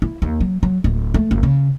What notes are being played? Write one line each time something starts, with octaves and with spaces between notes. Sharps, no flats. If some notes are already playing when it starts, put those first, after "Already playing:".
E4
D#2
F#3
F#3
D1
A3
F#1
C#3